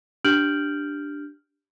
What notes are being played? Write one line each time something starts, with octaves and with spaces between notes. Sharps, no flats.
D4 G4 F6 G6 D7 F#7